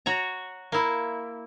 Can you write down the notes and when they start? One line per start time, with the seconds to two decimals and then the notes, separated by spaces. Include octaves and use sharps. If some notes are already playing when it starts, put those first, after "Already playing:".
0.06 F#4 C#5 A#5
0.72 A#3 E4